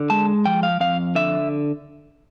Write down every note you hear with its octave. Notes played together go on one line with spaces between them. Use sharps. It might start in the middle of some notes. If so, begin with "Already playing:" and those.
Already playing: D3
G#3 A5
F3 G5
F5
F2 F5
D3 E5